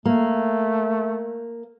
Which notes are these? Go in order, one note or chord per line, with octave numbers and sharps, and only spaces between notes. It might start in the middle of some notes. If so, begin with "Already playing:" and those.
A3 A#3